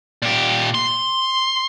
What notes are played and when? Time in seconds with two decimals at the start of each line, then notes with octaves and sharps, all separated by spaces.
0.22 A#2 G4
0.75 C6